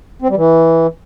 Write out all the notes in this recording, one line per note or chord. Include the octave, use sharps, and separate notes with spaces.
C4
G3
E3